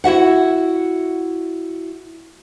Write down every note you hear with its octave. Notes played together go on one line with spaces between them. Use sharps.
E4 F#4 E5 F#5